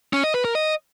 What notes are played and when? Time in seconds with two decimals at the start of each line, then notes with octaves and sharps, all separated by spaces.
0.13 C#4
0.24 D#5
0.34 B4
0.45 A#4
0.55 D#5